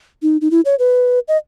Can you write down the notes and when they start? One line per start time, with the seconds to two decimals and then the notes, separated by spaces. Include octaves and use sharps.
0.22 D#4
0.41 D#4
0.51 E4
0.65 C#5
0.79 B4
1.28 D#5